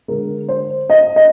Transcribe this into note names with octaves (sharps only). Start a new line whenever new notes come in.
D3 G#3 A#4
C5
D#5
D#5